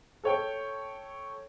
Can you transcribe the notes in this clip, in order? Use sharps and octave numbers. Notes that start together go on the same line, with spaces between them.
A4 C#5 G5